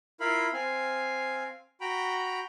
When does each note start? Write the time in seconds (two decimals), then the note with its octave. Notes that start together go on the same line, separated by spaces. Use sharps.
0.20 E4 F4 A#4 F5 B5
0.53 C4 F5 G#5
1.81 F#4 G5 A#5 B5